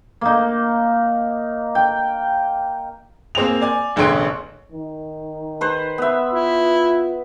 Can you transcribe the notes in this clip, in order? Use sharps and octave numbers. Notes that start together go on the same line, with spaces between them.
A#3 D#4
G5
A#3 C4 G#4 F7
D5 G#5
E1 A1 D3 C#5 C6 D7
D#3
B4 C5
B3 E5
E4 F4